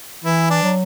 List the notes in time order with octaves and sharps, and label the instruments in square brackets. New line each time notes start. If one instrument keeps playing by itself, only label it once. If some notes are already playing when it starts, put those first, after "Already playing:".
[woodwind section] E3 [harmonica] E4
[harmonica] D4
[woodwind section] F#3